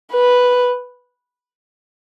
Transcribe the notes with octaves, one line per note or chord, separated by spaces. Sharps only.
B4